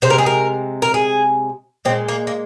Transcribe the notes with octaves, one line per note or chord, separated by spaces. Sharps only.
C3 G#3 C5
A#4
G#4
A#4
A#4
G#4
A#2 G#3 C4
A#3
A#3